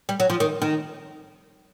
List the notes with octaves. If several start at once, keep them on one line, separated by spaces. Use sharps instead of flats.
G3
F#3
F3
D#3
D#3